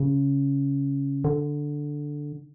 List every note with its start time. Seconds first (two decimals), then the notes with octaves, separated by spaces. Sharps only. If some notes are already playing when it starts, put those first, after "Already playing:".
Already playing: C#3
1.25 D3